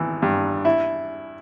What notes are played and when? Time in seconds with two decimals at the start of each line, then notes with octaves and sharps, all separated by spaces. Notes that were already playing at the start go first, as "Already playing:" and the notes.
Already playing: G#1 E3
0.22 G2
0.65 E4